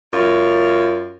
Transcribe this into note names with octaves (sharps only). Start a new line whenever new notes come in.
F#2 F4